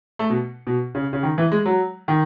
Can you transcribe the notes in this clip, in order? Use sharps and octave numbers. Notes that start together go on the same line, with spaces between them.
A3
B2
B2
C#3
C#3
D#3
E3
G#3
F#3
D#3